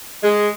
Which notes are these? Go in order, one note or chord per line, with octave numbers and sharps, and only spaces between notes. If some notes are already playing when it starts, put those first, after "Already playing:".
G#3